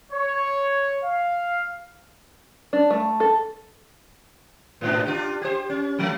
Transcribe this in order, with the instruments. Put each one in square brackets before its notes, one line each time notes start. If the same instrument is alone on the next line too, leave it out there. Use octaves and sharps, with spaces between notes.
[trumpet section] C#5
F5
[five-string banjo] D4
A3
A4
[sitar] G#2 B2 D4
D4 F4 G4
G4 C5
C#4
F3 G#3 A3